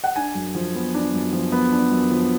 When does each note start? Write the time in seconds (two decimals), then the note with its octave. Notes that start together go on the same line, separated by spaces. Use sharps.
0.04 F#5
0.16 D4 G#5
0.35 F#2
0.55 F3
0.75 B3
0.94 D4
1.14 F#2
1.33 F3
1.52 B3
1.72 D4
1.91 F#2
2.11 F3